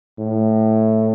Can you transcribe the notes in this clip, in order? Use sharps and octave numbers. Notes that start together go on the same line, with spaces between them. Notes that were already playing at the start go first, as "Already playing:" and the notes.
A2